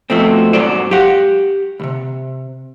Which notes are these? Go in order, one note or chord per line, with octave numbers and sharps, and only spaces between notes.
B2 F3 A3 C4
G#2 F#3 C5 D5
G4 F5 F#5
C2 C3